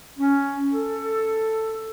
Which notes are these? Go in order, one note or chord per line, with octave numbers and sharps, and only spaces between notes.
C#4
A4